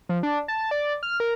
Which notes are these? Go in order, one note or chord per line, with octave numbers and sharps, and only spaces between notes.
F3
D4
A5
D5
F6
A#4